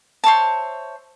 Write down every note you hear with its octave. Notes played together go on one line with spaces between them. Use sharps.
C5 C#5 E5 A5